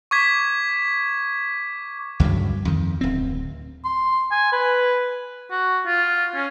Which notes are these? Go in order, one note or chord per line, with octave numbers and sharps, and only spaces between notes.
C#6 D6 G#6 B6
D2 G2 C#3 F#3
F2 D#3
D1 C4
C6
G#5
B4
F#4
F4
C#4